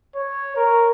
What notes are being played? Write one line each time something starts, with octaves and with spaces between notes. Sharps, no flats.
C#5
A#4